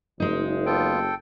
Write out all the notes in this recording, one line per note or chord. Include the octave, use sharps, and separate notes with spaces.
F#1 G#3 D#4
B3 F4 A4 G5